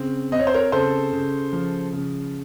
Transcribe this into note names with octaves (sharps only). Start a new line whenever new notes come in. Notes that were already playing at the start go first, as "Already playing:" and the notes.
Already playing: C#3 C4
C4 D#5
C#5
C5
A#4 C#5
C#3 A4 C5
C#3
F3
C#3